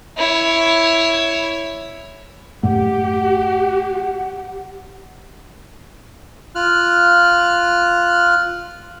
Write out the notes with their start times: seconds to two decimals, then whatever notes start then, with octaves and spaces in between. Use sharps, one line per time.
0.17 E4 C#5
2.63 F#2 A2 A3 G4 F#5
6.55 F4 F6 F#6